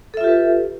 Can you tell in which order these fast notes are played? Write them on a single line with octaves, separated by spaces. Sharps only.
A4 E5 F4 G4 B4